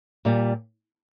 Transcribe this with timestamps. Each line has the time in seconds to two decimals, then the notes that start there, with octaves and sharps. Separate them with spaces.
0.25 A#2 G3